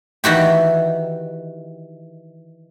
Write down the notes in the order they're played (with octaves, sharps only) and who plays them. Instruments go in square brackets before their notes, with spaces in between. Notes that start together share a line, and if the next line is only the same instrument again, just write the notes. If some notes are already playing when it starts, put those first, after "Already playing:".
[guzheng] D#3 E3 F#4 G4